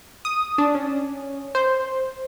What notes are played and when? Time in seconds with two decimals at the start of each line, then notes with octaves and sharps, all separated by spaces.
0.25 D#6
0.58 D4
0.75 C#4
1.55 C5